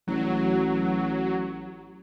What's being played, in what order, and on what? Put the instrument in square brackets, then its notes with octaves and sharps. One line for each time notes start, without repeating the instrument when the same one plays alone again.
[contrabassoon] A1 [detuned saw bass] F#3